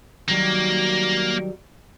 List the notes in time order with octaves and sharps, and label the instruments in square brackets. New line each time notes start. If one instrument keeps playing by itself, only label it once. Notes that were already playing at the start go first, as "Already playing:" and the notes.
[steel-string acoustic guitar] D#3 F#3 G3 [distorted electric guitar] A#3